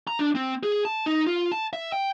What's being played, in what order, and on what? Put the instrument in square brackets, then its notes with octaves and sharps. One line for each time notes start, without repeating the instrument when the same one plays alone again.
[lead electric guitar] A#5
D4
C4
G#4
A5
D#4
F4
A5
E5
G5